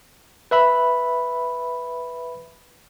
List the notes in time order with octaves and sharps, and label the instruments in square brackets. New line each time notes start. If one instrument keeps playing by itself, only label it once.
[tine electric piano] B4 E5 B5